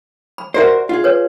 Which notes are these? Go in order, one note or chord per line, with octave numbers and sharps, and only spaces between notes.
B5
F#4 A#4 C5 D5 E5
F4 G#4
B4 C#5